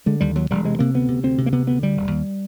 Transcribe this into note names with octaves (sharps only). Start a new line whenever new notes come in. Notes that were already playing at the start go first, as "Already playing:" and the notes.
D3 G#3
D#2 G3
D#2 F#3
E1 G3
C3 G#3
C3 A#3
D2 B3
C3
D2 C4
C3
A#3
C3 B3
D2 B3
D3 G3
E1
D#2